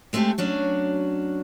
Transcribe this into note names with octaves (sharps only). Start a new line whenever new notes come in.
G#3 A3 C4 C#4 G4 A4
F#3 C#4 D4 F#4